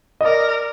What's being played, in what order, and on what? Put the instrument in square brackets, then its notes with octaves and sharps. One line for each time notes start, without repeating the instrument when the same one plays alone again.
[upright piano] D#5
[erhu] A#4 [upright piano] D5